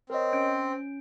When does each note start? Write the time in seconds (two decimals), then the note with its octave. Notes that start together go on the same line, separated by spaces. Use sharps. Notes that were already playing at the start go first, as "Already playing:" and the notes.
0.10 C4 A#4 C#5 D#5
0.33 C#4 G6 D7